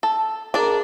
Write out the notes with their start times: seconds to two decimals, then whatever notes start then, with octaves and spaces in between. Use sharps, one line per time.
0.03 A4
0.54 D4 G#4 A#4 D5 A#5